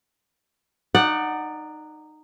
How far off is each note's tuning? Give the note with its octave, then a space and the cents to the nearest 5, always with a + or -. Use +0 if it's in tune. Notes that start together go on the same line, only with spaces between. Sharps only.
D#4 -15 D5 +10 F#5 +0